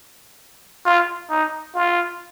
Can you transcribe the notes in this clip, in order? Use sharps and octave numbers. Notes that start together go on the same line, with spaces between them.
F4
D#4
F4